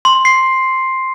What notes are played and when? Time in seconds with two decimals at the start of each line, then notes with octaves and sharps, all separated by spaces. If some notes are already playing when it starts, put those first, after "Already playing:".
0.05 C6
0.25 C7